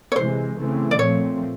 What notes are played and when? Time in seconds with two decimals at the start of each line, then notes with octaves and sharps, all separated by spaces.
0.12 C#5
0.16 C3 E3 G#3 C5
0.57 C#3 E3 A3 C4
0.91 D5
0.98 A#2 F3 A3 C4 C#5